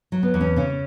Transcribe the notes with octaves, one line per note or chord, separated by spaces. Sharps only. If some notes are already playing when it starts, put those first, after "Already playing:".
F#3
B3
E2
C#4
C#3 C#4